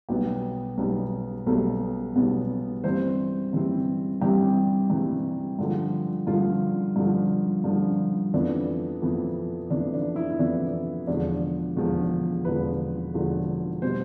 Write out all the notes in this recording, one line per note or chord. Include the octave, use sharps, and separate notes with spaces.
B1 B2 G3 B3 G4
B1 B2 G3 B3
B1 B2 G3 B3 A4
B1 B2 G3 B3
G2 E3 G3 C4 C5
G2 E3 G3 C4
G2 E3 G3 C4 G4
G2 E3 G3 C4
G2 D3 F3
G2 D3 F3 F4
G2 D3 F3
G2 D3 F3
F2 E3 B3 D4
F2 E3 B3
F2 E3 B3 D4
D4
E4
E4
F2 E3 B3 D4
E1 E2 D3 F3 D4
E1 E2 D3 F3
E1 E2 D3 F3 B4
E1 E2 D3 F3
B2 G3 C5